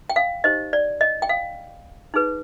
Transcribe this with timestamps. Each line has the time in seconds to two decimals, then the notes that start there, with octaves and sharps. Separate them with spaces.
0.10 G5
0.16 F5
0.44 D#4 G4 C5 D#5
0.73 D5
1.01 D#5
1.22 G5
1.29 F5
2.14 D#4 G#4 B4